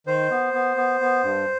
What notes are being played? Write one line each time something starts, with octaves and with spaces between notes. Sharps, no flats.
D#3 C5
B3
B3
B3
B3
G2